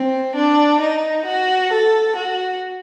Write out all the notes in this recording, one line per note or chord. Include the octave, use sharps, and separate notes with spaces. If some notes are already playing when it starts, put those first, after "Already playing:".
Already playing: C4
D4
D#4
F#4
A4
F#4